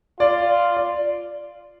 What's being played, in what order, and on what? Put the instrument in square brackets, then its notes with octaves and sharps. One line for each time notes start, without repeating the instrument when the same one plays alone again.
[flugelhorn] F4 [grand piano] D5
[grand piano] D5